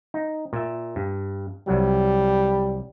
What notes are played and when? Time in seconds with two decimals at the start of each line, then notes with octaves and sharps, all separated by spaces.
0.14 D#4
0.53 A#2 E5
0.96 G2
1.68 C2 F#3 G3